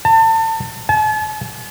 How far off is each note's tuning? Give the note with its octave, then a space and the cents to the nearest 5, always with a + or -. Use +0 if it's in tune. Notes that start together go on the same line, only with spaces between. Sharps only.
A5 +30
A5 -45